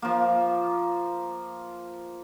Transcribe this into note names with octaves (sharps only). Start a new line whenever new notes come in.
F3 A#3